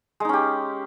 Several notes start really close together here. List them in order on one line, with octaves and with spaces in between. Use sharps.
G#3 D#4 C#4 G4